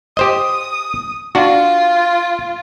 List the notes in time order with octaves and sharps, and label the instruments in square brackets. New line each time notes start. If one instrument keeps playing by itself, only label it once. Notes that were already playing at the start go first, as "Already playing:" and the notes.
[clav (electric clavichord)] G4 C5 D#5 [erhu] D#6
[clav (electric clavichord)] D4 F#4 [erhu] F4